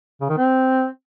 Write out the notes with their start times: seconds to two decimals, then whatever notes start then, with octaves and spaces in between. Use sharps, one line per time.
0.21 C#3
0.29 D#3
0.38 C4